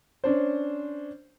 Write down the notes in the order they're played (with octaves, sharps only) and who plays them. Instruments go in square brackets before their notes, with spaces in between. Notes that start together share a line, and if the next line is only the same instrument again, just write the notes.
[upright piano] C#4 D4 C5